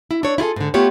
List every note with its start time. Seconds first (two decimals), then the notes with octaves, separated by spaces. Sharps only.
0.11 E4
0.23 D4 C#5
0.38 E4 F4 G#4 A4
0.56 G#2 D3
0.74 A3 B3 F4 G4 C#5